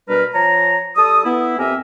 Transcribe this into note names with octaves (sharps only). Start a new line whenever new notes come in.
B2 G3 D4 A#4 B4
F3 C#5 A5 A#5
G3 A4 A5 D#6
B3 E4
F2 C4 G4 A#4 E5 G#5